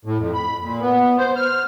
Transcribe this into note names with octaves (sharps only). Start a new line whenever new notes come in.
A2
F2
B5
A#2
B3
C5
F6